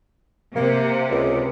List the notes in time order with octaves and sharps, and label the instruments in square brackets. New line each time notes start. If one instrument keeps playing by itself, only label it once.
[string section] C3 [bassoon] A#3
[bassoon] C#2